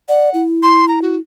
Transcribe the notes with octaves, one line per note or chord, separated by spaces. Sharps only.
D5 F#5
E4
C6
A#5
F#4